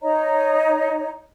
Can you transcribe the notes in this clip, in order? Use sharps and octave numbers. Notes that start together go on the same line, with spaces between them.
D#4 C#5 D#5 A#5